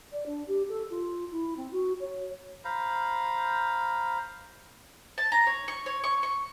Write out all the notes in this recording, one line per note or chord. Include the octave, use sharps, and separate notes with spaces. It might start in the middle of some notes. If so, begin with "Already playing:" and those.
D5
D4
G4
A4
F4
E4
C4
F#4
C#5
C5 F5 A#5 B5
A5
A#5
C#5
C#6
C#5
C#6
C#6